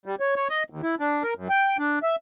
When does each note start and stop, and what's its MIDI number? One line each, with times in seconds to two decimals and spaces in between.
0.06 0.15 55
0.20 0.35 73
0.36 0.48 73
0.50 0.63 75
0.70 0.81 39
0.83 0.95 64
1.00 1.23 62
1.23 1.34 70
1.36 1.48 42
1.49 1.77 79
1.79 1.99 62
2.03 2.16 76